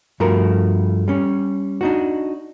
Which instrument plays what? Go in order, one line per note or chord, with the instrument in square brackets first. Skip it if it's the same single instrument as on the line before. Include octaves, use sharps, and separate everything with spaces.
[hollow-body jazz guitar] G2 F3 A3 F#4 A#4
G3 C#4
D4 D#4 F#4